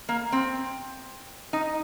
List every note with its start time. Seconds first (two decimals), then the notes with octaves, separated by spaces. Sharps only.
0.09 A#3
0.32 C4
1.53 D#4